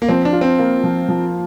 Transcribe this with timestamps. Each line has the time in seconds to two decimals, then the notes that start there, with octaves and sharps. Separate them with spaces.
0.02 A#3
0.09 F3 C4
0.25 D4
0.33 F4
0.41 C4
0.59 A#3
0.84 F3
1.08 F3